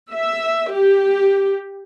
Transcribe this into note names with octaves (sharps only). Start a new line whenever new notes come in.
E5
G4